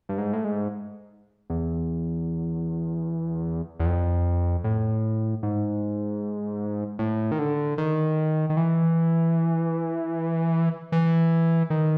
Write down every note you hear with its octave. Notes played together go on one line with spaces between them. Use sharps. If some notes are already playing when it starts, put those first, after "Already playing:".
G2
G#2
A2
G#2
E2
E2
F2
A2
G#2
A2
D#3
D3
D#3
D#3
E3
E3
D#3